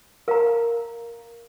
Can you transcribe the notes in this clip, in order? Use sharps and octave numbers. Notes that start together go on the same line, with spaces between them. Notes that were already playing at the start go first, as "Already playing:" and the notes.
A#4 F5 A#5